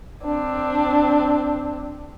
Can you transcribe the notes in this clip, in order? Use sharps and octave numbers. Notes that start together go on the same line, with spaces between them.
C4 D4